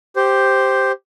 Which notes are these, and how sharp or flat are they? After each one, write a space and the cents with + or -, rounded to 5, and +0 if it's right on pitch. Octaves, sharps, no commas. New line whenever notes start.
G4 +0 C5 +0